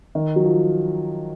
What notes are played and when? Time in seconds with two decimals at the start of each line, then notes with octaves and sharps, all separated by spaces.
0.15 D#3
0.36 F#3
0.45 F3